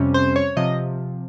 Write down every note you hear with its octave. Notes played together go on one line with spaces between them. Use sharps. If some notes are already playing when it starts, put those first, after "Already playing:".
Already playing: F2 C3 G3 C#4
C5
C#5
C3 F3 D#5